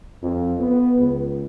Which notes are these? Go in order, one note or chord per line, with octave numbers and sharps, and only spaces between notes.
F2
B3
C#2